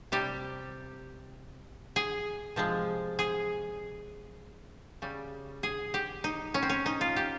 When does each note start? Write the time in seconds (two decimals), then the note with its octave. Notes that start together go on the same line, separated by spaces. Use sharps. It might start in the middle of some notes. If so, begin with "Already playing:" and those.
0.12 C3 G3 G4
1.96 G#4
2.56 C3 F3 G#3
3.19 G#4
5.02 C#3 G3
5.63 G#4
5.94 G4
6.24 D#4
6.54 C#4
6.62 C4
6.69 C#4
6.86 D#4
7.01 F4
7.16 G4